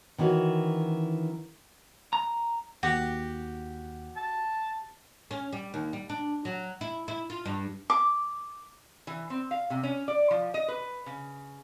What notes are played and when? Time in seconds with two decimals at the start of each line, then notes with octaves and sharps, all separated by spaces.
0.18 D#3 E3 C#4 F#4
2.13 A#5
2.83 D#2 F#4 G4
4.17 A5
5.31 C#4
5.52 G3
5.74 D#2
5.93 G3
6.09 D4
6.45 F#3
6.81 E4
7.08 E4
7.30 F4
7.45 G2
7.90 D6
9.07 E3
9.30 C4
9.51 F5
9.70 C3
9.83 C#4
10.08 D5
10.31 F3
10.54 D#5
10.68 B4
11.06 C#3